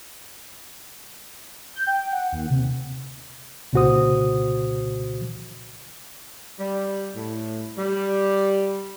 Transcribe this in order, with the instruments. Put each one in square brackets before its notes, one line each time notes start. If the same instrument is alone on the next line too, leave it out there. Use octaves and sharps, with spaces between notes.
[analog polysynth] G6
G5
F#5
D#2
C3
[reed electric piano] C2 A#2 C#3 F#4 C5 D#6
[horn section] G3
A2
G3